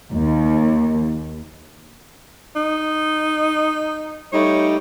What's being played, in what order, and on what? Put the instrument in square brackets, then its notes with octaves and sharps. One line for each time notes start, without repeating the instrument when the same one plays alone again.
[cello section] D#2
[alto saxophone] D#4
[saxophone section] G3 A3 D#4 [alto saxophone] C#5